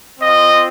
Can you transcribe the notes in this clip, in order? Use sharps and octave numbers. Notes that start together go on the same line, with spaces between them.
C4 F4 D#5